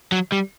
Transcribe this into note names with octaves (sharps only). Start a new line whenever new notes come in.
F#3
G3